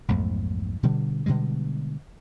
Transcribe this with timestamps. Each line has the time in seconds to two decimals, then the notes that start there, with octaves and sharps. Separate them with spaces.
0.08 B1 F2 G#2 A3
0.83 B2 D3 G3
1.26 B2 D3 G3 G#3